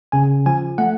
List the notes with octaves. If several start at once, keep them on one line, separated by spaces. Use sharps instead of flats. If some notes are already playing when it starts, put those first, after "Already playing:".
C#3 G#5
F3 G#5
A3 F#5